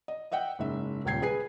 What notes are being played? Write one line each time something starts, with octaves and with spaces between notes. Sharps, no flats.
D#5
D#5 E5 F#5 G5
F#1 G#2 E5
D#1 C#2 G5 G#6 C7
G#4 B4 G#5 C7